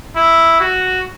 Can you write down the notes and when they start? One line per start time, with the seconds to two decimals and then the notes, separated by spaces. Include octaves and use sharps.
0.16 E4
0.60 F#4